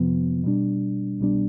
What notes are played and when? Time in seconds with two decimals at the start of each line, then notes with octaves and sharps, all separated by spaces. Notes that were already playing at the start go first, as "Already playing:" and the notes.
Already playing: F2 C3 F3 B3
0.44 B2 G3 D4
1.20 C2 B2 G3 B3 D4